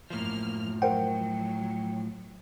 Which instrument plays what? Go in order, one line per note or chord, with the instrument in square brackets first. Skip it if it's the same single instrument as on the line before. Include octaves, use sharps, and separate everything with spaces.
[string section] F#2 A#3 F6 [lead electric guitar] A2 F3
[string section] F#3 [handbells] A#4 C5 F#5 [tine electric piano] G5